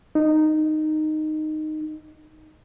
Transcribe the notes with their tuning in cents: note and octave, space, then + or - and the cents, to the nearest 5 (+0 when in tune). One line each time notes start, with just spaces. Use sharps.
D#4 -10